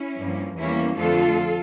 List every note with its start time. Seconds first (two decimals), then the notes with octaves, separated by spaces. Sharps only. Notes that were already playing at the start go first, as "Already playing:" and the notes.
Already playing: C#4 E4
0.19 G2 F3 A#3
0.58 E2 E3 G3 A#3 C#4 E4
0.97 F2 D3 F3 A3 F4 A4